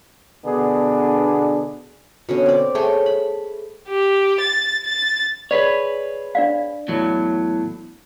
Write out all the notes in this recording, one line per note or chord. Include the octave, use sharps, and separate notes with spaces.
B2 D3 B3 D4 G#4
B2 D3 C#4
C4 D5
A3 G#4 C#5 G5
B5
G4
A6
A6
G#4 B4 C#5 D5
D4 D5 F5
E2 A2 F#3